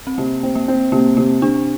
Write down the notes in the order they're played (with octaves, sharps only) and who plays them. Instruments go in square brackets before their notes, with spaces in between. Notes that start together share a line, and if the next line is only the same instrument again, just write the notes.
[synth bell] C4
[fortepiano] C3 [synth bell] A#3
[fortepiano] C4
[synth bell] A#3
[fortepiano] C4
[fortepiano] C3 [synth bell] A#3
[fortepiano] C3 [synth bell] A#3
[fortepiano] C3 [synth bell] D4